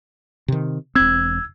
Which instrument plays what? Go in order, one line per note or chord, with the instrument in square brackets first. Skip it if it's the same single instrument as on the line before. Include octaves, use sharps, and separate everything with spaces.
[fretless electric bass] C3 D#3
[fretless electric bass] E1 C4 [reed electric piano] E6 G#6